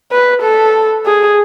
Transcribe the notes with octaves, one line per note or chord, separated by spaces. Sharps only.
B4
A4
G#4